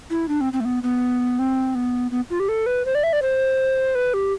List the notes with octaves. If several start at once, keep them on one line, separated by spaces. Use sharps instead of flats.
E4
D4
C4
C4
A3
B3
B3
C4
B3
B3
F4
G4
A4
B4
C5
D5
E5
D5
C5
B4
G4